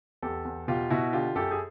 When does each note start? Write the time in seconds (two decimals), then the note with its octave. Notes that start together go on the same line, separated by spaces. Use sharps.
0.22 E2 G4 A4
0.45 E2
0.68 B2 F4 G4
0.90 B2 E4 F#4
1.13 D3 F4 G4
1.35 F#2 G4 A4
1.51 G#4